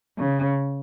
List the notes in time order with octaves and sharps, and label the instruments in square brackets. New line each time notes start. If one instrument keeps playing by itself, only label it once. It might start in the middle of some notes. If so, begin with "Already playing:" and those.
[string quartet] C#3